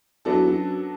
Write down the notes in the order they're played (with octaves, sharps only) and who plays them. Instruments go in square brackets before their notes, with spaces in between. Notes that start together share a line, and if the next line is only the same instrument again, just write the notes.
[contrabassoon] E2 [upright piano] F#3 B3 D4 F#4 A4
[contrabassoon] E2
F#2